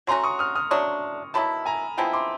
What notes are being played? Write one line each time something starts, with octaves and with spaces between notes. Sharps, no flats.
F#3 A3 C#4 F#4 A#5 C6
C#6 D#6
D#6 F6
D#6 F6
F#3 A3 D4 C#6 D#6
D#3 F#3 B3 E4 A5 B5
G#5 A#5
F3 G#3 B3 E4 G5 A5
C6 D6